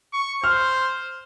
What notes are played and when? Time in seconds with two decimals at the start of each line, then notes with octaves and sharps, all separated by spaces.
0.13 C#6
0.44 C5 F6